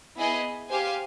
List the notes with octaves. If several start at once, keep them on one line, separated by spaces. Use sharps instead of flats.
B3 E4 G#4 B4 D#5
G4 C5 F5 G#5